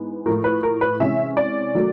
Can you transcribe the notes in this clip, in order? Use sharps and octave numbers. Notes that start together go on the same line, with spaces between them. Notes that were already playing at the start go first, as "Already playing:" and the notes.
Already playing: G#2 E3 G#3 B3
A2 F3 A3 A#4
B4
A#4
B4
C3 E3 G#3 C#4 E5
D5
D#3 F#3 A3